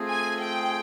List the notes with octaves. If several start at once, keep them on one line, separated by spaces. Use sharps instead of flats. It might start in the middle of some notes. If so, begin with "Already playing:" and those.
Already playing: A3 C4 F4 G#4
G#5
G5